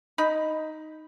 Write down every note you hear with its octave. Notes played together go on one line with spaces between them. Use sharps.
D#4 B5